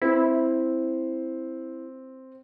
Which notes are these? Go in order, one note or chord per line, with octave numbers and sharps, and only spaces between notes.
C4 E4